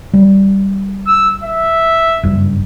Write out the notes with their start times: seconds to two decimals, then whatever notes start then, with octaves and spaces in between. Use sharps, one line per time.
0.13 G3
1.07 E6
1.43 E5
2.23 F#1 G2